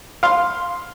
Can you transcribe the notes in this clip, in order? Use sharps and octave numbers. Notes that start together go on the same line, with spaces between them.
F5 C6